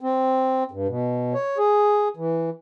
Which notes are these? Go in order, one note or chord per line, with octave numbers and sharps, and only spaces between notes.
C4
G2
B2
C#5
G#4
E3